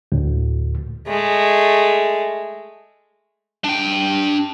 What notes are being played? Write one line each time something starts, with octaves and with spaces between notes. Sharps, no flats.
D2 A2
G#3 A3
D4 G5